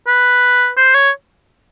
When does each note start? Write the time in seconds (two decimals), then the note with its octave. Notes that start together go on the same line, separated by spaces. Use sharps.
0.08 B4
0.77 C5
0.94 C#5